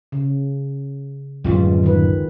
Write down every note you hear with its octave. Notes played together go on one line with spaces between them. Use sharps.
C#3
D1 F#2 E3 G3 G#3 F4
D#3 B4